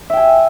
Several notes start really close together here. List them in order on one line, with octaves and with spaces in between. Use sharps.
E5 G5 G#5